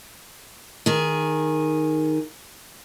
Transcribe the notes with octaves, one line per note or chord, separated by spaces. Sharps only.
D#3 G#4